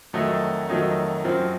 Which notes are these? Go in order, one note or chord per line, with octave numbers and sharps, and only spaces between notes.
F2 D#3 F#3 A3 D#4
F2 D#3 F#3 A3 D#4
F#2 F3 C4